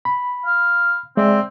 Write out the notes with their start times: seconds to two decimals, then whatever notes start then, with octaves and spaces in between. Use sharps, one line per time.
0.05 B5
0.46 F5
1.17 G#3 C4 D5 E5